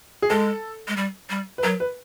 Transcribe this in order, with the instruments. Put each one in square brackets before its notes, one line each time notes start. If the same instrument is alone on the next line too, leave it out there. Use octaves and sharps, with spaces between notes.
[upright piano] G#4
[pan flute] G#3 [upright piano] A4
[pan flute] G#3
G3
G3
[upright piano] B4
[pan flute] F#3 [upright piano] A#4
[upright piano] B4